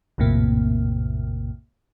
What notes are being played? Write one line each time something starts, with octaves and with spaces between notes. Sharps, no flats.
A#1 F2 A2 C3 A#3